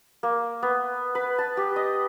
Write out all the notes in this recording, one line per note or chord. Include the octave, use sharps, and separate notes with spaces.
A#3
B3
B4
A5
G4
D#5